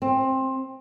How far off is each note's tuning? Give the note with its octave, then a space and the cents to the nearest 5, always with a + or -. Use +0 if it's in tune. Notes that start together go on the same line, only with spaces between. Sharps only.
C4 +15